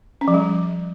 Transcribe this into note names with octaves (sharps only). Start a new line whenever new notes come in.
C#4
F3
G3